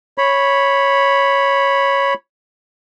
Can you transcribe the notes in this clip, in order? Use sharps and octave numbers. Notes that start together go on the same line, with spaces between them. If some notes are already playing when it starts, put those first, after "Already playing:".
C#5 B5